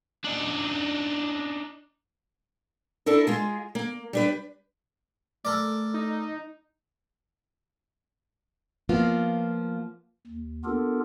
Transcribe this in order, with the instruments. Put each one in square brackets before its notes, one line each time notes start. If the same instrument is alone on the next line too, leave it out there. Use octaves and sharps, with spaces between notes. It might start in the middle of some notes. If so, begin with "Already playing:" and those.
[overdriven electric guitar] D4 D#4
[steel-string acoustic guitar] D4 E4 A4 A#4
G#3 F4 G#4
A#3
G3 D4 B4
[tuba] A3 [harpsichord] A4 A#4 D5
[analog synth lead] D#4
[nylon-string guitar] F3 A#3 B3 F4
[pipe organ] D#2
B3 D4 F4 G4 A4 A#4